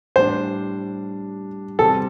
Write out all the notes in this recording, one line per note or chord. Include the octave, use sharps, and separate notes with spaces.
A2 G3 D4 C5
C3 G3 C4 F4 A4